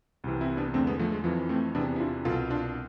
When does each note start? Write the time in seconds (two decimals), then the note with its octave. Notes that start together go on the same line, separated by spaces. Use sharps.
0.24 C2 C3 E3
0.41 C4 E4
0.57 B3 D4
0.74 E2 D3 A3 C4
0.87 G#3 B3
0.99 F3 A3
1.12 G#3
1.24 F2 E3 F3
1.49 A3 C4
1.75 E2 C3 E3 B3 D4
1.96 E4
2.00 D4 F4
2.25 C2 B2 F4 A4
2.51 D4 F4